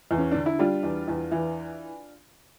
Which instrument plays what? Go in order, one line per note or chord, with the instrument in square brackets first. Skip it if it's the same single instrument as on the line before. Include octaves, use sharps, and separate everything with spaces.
[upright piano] E2
C#4
D3 D4
E4
G3 D4 F4
E2
E2
E3